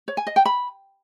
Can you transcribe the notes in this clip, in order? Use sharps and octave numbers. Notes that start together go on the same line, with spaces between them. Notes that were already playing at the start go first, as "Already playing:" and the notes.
C#5
G#5
D#5
G5
B5